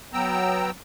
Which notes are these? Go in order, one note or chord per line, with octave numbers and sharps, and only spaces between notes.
F#3 B3 G5 A#5 E6